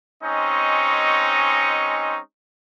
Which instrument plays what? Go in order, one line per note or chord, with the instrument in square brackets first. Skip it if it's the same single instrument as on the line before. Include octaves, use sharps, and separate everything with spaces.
[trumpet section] G#3 C4 C#4 D#4 D#5 C#6